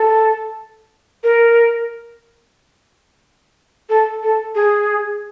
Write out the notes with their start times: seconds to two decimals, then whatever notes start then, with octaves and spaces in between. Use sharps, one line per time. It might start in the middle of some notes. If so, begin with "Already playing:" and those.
Already playing: A4
1.24 A#4
3.89 A4
4.23 A4
4.55 G#4